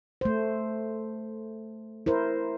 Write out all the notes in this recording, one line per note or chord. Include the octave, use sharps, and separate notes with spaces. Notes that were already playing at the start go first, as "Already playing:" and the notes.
A3 C5
E4 A#4 C5